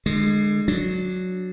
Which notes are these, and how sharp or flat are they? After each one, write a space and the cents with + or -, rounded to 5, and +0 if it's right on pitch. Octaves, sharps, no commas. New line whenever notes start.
D3 +35 G#3 +0
F#3 -10 D4 +5